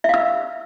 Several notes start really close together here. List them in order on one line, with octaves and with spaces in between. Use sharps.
E5 F5 E6